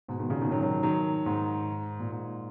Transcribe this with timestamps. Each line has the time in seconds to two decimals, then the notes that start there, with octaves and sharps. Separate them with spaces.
0.08 G#2 B2
0.19 B2 D#3
0.30 A#2 C#3
0.41 B2 D#3
0.52 D#3 F#3
0.62 D#3 F#3
0.83 D#3 F#3
1.26 G#2
2.00 A#2
2.11 G#2